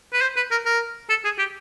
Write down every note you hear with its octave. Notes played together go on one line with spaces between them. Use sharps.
B4
C5
B4
A#4
A#4
A4
G#4
G4